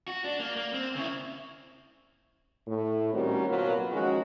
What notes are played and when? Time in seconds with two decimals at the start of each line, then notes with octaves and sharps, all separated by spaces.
0.08 F#4
0.24 D4
0.40 A#3
0.57 A#3
0.74 C4
0.96 C#3 E4
2.67 A2
3.13 D#3 G3 C4 C#4 F#4 A#4
3.48 B2 F#3 A#3 F4 B4
3.91 D#3 F3 G#3 C#4 F#4